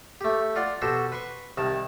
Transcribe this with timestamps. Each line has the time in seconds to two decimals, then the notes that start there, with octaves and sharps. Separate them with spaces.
0.21 A3 G4
0.56 F4 D5 F#5 C6
0.82 B2 F#4 G4 A4 C5 C6
1.12 B4 C6 C#6
1.57 C2 D#3 A5